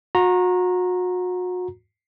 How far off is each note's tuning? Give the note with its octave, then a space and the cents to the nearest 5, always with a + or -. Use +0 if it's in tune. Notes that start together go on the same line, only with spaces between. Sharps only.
F#4 -35 A#5 +0